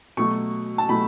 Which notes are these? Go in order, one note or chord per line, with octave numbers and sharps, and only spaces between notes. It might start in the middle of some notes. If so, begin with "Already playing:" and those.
B2 F#3 A3 C#6
A5
B2 F#3 A3 B5